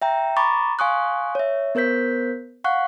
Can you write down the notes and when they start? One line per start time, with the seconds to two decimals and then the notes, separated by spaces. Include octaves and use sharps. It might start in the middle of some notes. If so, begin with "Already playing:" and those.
0.02 E5 G5 A#5
0.37 A#5 B5 C#6 D6 A6
0.79 F5 G#5 C6 C#6 D#6 F#6
1.35 C#5 E5
1.75 B3 A#4 C5 G6 B6
2.64 F5 F#5 C#6 F#6